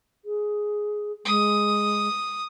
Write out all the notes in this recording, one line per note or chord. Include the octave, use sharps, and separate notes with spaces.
G#4
G#3 D#6